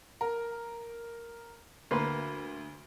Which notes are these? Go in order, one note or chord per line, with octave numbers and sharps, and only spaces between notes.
A#4
D2 A#3 B4 C6